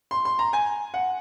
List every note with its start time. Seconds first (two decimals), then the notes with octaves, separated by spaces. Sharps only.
0.11 C6
0.25 C6
0.39 A#5
0.53 G#5
0.94 F#5